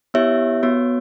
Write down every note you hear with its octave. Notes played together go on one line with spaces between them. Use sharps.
B3 E4 G4 C#5 E5
B3 F#4 C#5